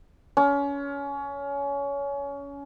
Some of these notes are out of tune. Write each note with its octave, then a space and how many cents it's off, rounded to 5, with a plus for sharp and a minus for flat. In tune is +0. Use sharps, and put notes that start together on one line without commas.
C#4 +25